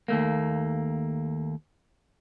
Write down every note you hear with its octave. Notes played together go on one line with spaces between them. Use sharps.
D#2 A3 A#3